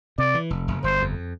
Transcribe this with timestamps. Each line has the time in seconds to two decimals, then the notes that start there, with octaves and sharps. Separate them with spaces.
0.18 C3 D5
0.34 E3
0.50 F1
0.68 F1
0.84 G1 C5
1.01 F2